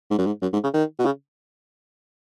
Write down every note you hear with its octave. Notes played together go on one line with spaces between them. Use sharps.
G#2
F#2
G#2
F#2
G#2
C#3
D#3
B2
C#3